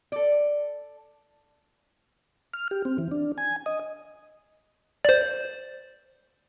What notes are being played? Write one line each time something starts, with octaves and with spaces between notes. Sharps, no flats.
A4 D5
F6
G4
C4
E3
D4
G#5
D#5
C5 D5